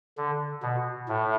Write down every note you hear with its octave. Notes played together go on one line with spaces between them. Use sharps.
D3
B2
A2